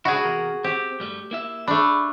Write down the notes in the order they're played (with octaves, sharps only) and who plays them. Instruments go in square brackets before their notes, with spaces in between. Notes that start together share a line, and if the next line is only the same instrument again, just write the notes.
[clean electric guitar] C#2 D4 E4 [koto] F#4 G#4
[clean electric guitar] E2 C3 A#4
[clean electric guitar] C4 [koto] G4
[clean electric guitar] G2 G3 A3
A#3 E4 E5
[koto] A3 D4 [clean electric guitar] B5